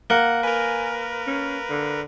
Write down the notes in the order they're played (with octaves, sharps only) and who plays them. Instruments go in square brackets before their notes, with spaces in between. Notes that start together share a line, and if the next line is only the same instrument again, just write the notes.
[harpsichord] A#3 [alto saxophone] F#5
[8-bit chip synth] A#4 B4 [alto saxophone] G#5
[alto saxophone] C#4
D3